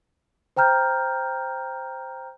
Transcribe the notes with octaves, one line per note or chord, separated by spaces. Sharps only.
C5 G5 A#5 F6 G6